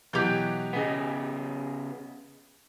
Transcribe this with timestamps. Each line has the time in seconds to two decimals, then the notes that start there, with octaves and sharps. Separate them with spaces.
0.13 B2 E3 F#3 G4 G6
0.73 C#3 B3 G#4 D#5